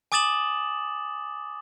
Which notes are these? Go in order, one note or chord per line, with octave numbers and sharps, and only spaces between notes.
G#5 D6 D#6 A6 E7 F#7